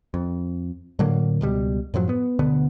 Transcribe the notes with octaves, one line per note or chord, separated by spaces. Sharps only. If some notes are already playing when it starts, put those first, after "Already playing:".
F2
A2 D3 F#3 A#3
C#2 B2 G3
F#2 A2 F3 F#3
B3
D2 B2 D3 B3